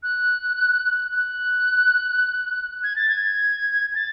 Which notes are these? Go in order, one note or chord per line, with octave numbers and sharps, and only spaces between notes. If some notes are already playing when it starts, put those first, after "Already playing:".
F#6
F#6
G#6
A6
G#6
A6